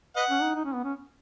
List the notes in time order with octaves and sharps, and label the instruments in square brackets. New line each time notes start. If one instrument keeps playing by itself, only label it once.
[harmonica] B4 D#5 F#5
[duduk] C#4
D#4
D#4
C#4
B3
C#4